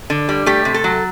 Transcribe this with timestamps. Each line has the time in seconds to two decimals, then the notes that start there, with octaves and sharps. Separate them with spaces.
0.10 D3
0.29 G3
0.46 A3 G4
0.65 C3
0.74 A4
0.84 F#3